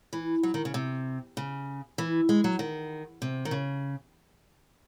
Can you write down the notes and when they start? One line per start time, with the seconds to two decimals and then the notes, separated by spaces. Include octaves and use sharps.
0.13 E3
0.43 F#3
0.54 D#3
0.65 C#3
0.74 C3
1.37 C#3
1.98 E3
2.29 G#3
2.44 F#3
2.59 D#3
3.22 C3
3.45 D#3
3.51 C#3